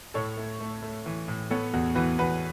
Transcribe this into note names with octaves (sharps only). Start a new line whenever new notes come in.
A2 A4 C#5
A3
A3
A3
E3
A2
B3 A4 C#5
E2 F#4
E3 F#4 B4
E2 F#4 B4